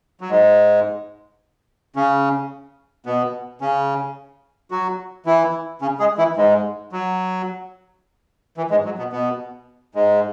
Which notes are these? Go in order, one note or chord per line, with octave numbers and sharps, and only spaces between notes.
F#3
G#2 G#3
C#3 C#4
B2 B3
C#3 C#4
F#3 F#4
E3 E4
C#3 C#4
G#3 G#4
E3 E4
G#2 G#3
F#3
E3
G#2 G#3
F#3
B2 B3
B2 B3
G#2 G#3